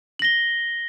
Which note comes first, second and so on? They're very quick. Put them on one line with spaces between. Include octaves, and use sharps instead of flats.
F#7 A#6 G7